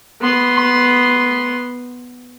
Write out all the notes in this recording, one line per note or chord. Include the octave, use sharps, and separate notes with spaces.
B3 C6